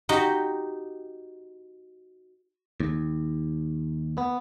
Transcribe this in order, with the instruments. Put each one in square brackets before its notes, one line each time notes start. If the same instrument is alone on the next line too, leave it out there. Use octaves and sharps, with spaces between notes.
[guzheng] D#4 F#4 G4
[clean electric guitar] D#2
B3